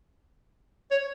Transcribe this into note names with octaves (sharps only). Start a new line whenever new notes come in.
C#5